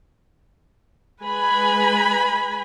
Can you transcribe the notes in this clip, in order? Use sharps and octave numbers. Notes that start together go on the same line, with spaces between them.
G#3 B4 G#5 B5